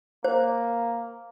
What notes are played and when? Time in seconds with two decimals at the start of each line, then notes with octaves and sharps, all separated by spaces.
0.24 A#3 C5